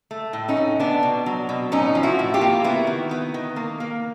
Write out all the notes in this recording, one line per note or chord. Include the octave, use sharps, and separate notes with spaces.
A3
A2
C#4 D#4
A2
B3 D4
B2
F#3
B2
A2 C#4 D#4
F3
E4 F#4
A2
F4 G4
A#3
B3 E4 F#4
D#3
B3
D#3
A#3
A#3